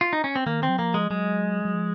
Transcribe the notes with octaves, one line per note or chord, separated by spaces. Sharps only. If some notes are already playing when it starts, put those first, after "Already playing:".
F4
D#4
C#4
C4
D#3 A#3
C4
F#3
F3 A#3
G#3
F#3 G#3
F#3
F3